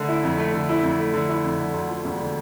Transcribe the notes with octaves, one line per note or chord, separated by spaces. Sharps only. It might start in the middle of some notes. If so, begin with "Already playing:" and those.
Already playing: D3 A3
E4
F2
A3
D3
E4
F2
A3
D3
E4
F2
D3
D2
F3
E1
D3